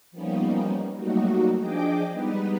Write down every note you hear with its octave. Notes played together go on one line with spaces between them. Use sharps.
F3 G3 A#3 B3 C#4 D#4
F#3 G3 A3 A#3 D#4 F#4
F3 D4 G#4 D#5 G5 D6
G3 G#3 B3 D#4 B4